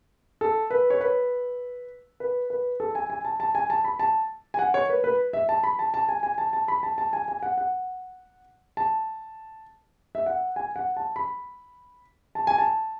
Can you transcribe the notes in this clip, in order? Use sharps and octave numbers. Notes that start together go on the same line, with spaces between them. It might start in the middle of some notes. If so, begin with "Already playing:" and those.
A4
B4
C#5
B4
B4
B4
A4
G#5
G#5
A5
A5
G#5
A5
B5
A5
G#5
F#5
C#5
B4
B4
E5
A5
B5
A5
A5
G#5
G#5
A5
A5
B5
A5
A5
G#5
G#5
F#5
F#5
A5
E5
F#5
G#5
F#5
A5
B5
A5
G#5
A5